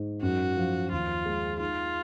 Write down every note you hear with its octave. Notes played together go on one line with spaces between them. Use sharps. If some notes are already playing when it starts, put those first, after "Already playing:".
Already playing: G#2
F#2 F#4
F3
D#2 F4
G#3
D#4 F4